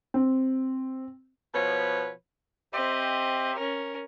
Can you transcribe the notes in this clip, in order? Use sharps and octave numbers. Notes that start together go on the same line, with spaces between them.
C4
B2 F3 B4 C#5
C4 G4 C5 D#5 E5
C#4 A#4